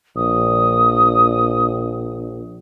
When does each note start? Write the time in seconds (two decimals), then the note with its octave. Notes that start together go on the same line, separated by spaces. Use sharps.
0.16 A#1 D#6